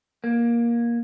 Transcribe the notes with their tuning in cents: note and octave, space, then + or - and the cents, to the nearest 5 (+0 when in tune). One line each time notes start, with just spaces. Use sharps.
A#3 +15